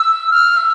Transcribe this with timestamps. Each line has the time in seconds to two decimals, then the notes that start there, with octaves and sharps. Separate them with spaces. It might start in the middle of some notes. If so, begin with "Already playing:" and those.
Already playing: E6
0.31 F6
0.57 E6